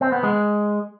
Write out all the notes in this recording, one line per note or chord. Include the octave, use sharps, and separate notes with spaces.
C4
B3
G#3